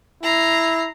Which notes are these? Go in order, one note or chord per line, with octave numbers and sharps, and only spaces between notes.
E4 A#5 C7